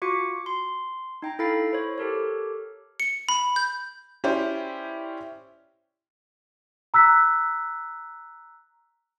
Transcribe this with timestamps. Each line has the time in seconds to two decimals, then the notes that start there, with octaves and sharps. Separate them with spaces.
0.02 F4 F#4 D6 C#7
0.46 C6
1.22 D#4 G5 A#5
1.39 E4 A4 F5 B5 A6 C7
1.71 E4 C5 C#5
1.98 G4 A4 A#4 C#5
3.00 C#7
3.29 B5
3.56 G6
4.24 C#4 E4 G4 C5 D5
6.94 A#5 E6 F#6 B6